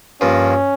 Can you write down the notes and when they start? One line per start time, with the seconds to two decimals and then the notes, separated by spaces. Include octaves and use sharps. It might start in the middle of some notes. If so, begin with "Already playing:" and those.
0.21 G2 F3 A#3 C#4